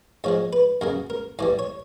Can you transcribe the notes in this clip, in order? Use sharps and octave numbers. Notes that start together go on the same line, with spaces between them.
G#2 F3 G#3 C#5
B4
F#2 C#3 F#3 A#4
A#4
A2 E3 G3 D5
C#5